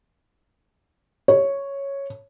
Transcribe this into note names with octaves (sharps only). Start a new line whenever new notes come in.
C#5